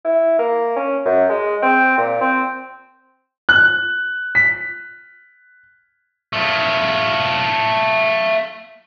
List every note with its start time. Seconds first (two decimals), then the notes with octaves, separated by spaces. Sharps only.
0.04 E4
0.39 A#3
0.76 C#4
1.05 F#2
1.29 G#3
1.62 C4
1.98 A#2
2.21 C4
3.49 F#6
4.35 B6
6.33 A3 F4